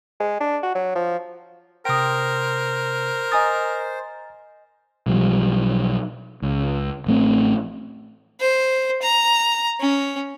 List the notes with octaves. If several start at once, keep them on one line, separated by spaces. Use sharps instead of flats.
G#3
D4
F#4
F#3
F3
C3 A#4 C5 G5 D#6 A#6
D#5 G#5 A#5 D#6 A6
B1 F3 G3
C#2
A1 A3 C4
C5
A#5
C#4